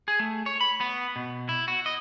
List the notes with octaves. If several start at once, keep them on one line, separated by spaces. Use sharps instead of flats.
G#4
A3
C#5
B5
B3
B2
E4
F#4
D#5